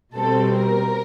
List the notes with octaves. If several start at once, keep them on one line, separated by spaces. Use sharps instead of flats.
B2 G3 C4 A4
A#4